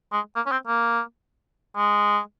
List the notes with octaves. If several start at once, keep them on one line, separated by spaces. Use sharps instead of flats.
G#3
A#3
C#4
C4
A#3
G#3